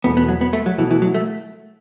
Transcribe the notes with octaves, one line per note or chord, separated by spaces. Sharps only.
E2 B2 A3 B3 F#4 A4
B3
F#3
B3
A3
F#3
B2 E3 A3 F#4 A4
E3
F#3
A3